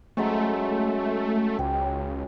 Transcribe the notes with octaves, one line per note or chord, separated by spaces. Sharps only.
F#3 G#3 A3 C#4
C#2 G5